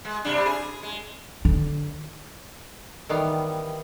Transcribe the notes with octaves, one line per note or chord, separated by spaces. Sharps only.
G#3
C3 G3 D4
G#4
G#3
D3
D#3 E3 G3 B3 F5